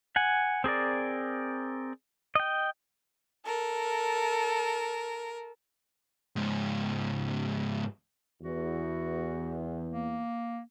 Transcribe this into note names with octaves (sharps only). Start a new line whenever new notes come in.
F#5 G#5
C4 G#4 A#4 D5
D#5 G5
A4 A#4
C#2 G#2
E2 F#4
A#3